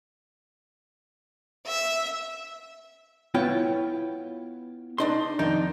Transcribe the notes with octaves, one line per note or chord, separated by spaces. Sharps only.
E5
B3 E4 F4 C#5 G5
D4 D#4 C6
F2 D#3 D4 D#4